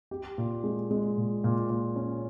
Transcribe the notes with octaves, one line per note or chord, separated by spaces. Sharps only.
G4
A#2
G#3
G#3
A#2
A#2
A#2
C#4